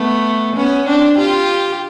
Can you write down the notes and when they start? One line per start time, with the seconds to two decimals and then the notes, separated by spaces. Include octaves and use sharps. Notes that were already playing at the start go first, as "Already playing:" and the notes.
Already playing: A3 B3
0.55 B3 C#4
0.87 C4 D4
1.18 F4 G4